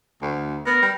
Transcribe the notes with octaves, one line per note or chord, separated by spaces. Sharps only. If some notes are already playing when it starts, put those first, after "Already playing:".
D2
B3 A#4
G3